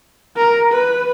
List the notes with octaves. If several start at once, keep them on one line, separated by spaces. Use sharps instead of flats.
A#4
B4